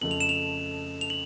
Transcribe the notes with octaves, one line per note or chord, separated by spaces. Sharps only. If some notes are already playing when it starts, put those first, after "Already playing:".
F2 C#3 F3 A3 F#7
F7
E7
F7
F7
F#7